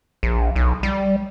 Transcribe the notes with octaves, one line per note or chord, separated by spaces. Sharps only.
A#1
B1
G3